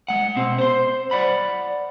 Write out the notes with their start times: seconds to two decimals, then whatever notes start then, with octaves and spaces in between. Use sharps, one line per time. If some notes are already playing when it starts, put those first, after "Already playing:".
0.08 G#3 F#5
0.36 B2 C4
0.58 C5 C6
1.11 D5 F#5 B5